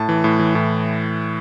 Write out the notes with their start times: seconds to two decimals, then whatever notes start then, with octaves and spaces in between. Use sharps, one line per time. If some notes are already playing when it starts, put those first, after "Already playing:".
Already playing: A2 A5
0.09 E3
0.24 A2
0.40 E3
0.55 A2